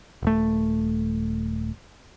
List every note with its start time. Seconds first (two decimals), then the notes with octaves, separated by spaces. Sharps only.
0.23 D#1 A3